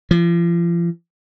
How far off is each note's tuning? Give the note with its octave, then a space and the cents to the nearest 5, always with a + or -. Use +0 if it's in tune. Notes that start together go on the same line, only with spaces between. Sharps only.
F3 -40